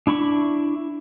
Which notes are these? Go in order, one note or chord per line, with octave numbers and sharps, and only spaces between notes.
D4 E4 B5 C#6